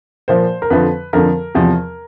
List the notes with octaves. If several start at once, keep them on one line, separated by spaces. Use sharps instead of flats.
A#2 F3 C5
A#4
F2 D3 F3 B4
F2 D3 F3 A#4
E2 C3 F3